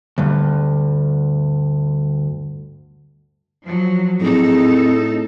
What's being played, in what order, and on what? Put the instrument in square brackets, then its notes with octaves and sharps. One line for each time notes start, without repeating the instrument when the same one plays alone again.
[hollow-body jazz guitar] D2 G2
[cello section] F3 F#3
[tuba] A2 [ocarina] C4 [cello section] D#4 A4 [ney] G#4